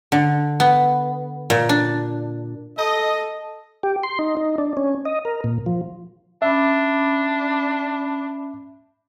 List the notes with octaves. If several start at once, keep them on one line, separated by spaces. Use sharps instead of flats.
D3
B3
A#2
D4
A4 D#5
G4
C6
D#4
D#4
D4
C#4
D#5
A#4
A#2
F3
C#4 D4 E5 B5 D6